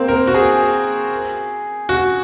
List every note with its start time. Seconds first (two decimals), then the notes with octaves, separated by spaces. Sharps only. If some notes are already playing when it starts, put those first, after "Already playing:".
Already playing: A#3 C4
0.08 A#4
0.27 F#4
0.34 G#4
1.89 F#4